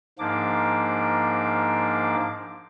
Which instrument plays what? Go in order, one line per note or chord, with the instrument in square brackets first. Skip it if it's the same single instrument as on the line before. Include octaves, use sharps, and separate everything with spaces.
[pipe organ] G#2 F3 A#3 D4 D6